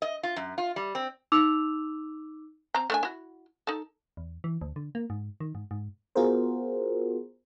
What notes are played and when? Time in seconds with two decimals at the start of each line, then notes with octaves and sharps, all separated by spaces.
0.02 D#5
0.23 F4
0.36 F#2
0.58 F4
0.76 G3
0.95 C4
1.32 D#4 D6 E6 F7
2.74 C4 A#5
2.90 A3 D4 G#5
3.03 E4 F#4
3.67 D#4 A4
4.17 E2
4.44 E3
4.61 D2
4.76 D3
4.95 A#3
5.10 G#2
5.40 D#3
5.55 G#2
5.71 G#2
6.15 B3 F4 F#4 G#4 A#4 C5